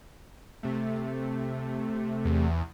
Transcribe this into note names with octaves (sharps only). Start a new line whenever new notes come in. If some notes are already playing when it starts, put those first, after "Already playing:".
C3 A3
E2